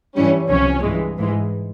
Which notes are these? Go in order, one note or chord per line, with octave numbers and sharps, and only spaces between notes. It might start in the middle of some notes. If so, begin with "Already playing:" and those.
G2 E3 G3 C#4
C2 C3 F3 C#4
G2 E3 G#3
G#2 E3 G#3